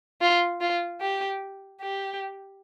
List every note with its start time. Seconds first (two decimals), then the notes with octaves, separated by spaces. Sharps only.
0.21 F4
0.61 F4
1.00 G4
1.81 G4